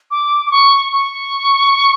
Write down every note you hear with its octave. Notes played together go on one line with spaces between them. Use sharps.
D6
D6
C#6
C#6